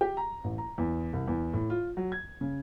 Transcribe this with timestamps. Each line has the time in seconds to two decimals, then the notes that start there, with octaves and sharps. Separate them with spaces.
0.01 G4
0.17 A#5
0.44 A1
0.58 A#5
0.78 E2
1.13 C2
1.28 E2
1.53 A2
1.70 F4
1.97 F#3
2.12 G#6
2.41 C#3